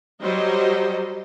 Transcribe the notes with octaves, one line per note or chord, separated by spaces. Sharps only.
F#3 G3 C5 D#5